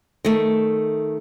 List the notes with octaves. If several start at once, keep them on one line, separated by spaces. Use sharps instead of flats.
D#3 A3